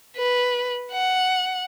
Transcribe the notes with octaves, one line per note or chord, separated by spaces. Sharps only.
B4
F#5